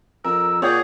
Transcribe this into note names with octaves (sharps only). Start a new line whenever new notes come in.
F2 A#4 E6
A#2 G#4 C#5 D5 F#5 G5